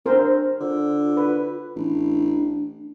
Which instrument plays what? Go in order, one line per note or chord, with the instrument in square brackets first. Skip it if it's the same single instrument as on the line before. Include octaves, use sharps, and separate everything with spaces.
[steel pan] C4 A#4 C5 [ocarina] D4
[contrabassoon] D3 [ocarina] F4
[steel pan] B4
[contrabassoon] A1 [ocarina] D4